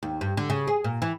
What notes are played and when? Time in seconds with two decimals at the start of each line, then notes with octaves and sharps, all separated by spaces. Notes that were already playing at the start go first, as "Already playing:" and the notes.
0.03 D#2
0.21 G2
0.37 D3
0.50 C#3
0.67 G#4
0.84 A#2
1.02 E3